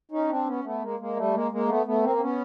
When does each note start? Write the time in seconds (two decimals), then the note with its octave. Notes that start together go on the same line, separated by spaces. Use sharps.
0.11 C#4 D#4
0.29 C4 D4
0.46 B3 C#4
0.64 A3 B3
0.82 G#3 A#3
0.99 G#3 A#3
1.17 G3 A3
1.34 G#3 A#3
1.51 G#3 A#3
1.68 A3 B3
1.86 A3 B3
2.03 A#3 C4
2.16 C4
2.21 B3 C#4